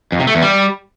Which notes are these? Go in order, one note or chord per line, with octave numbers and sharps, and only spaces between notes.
F2
C3
A3
E2
G3